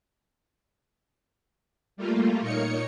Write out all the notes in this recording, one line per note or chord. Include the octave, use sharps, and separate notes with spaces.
G3 A3 A#3 F4
A#2 A#3 D#4 C#5 C#7